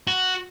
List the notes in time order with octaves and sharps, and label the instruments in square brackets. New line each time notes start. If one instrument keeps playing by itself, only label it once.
[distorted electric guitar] F#4